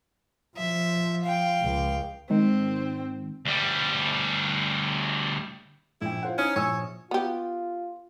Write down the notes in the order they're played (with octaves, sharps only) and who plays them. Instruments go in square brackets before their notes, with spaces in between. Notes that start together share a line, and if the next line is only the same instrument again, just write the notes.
[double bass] F3 [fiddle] E5
[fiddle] F5 G5
[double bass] C#2
[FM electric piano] G#2 D#3 [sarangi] C4
[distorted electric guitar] D2 G3
[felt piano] A#1 G5 [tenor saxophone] E4
[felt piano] F4 C5 F#5
[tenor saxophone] C#4 [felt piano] D#4 E4 D#6
[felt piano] A#1 G#5 E6 [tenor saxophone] C#5
[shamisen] B3 G4 [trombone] F4